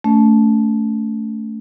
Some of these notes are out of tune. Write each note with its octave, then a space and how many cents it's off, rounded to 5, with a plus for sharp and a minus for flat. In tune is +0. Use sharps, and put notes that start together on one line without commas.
A3 +0 C#4 +35